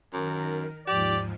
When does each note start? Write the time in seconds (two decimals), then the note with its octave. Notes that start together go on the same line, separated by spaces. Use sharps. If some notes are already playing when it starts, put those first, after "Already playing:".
0.13 F#2 D#3 A#4
0.87 D#2 G#2 F3 G4 D5